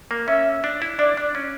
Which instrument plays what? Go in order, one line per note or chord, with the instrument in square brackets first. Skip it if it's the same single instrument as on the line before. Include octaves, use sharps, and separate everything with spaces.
[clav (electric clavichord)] A#3
[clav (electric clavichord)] C#4 [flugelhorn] E5
[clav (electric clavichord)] D4
E4
[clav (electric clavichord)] D4 [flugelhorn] D5
[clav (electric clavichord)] D4
C#4